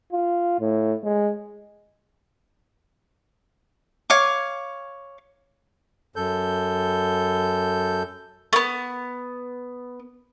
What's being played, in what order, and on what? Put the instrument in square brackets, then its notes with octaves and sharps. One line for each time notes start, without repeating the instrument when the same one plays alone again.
[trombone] F4
A2
G#3
[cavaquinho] C#5 F5 D6
[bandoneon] F#2 A4 G6
[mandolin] A3 B3